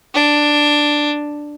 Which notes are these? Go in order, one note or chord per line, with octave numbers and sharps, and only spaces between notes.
D4